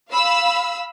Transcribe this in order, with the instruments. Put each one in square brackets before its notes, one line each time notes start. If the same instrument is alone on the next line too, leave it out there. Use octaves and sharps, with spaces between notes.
[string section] F5 B5 E6